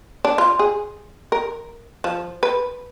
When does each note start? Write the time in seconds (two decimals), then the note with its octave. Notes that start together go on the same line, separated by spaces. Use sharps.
0.25 D4
0.38 F4
0.59 G#4
1.32 A#4
2.04 F3
2.43 B4